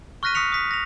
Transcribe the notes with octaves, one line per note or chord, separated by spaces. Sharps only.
C#6 F6 F#6 A#6 B6 D#7
C#6 D#6 B6 C#7 F7
D#6 B6
A#6 F7